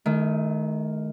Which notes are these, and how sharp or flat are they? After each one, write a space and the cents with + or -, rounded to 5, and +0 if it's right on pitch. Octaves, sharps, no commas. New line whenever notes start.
D#3 +0 A3 -35 E4 +10